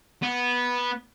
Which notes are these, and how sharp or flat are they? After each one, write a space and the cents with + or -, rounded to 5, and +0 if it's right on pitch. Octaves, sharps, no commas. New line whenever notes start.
B3 -10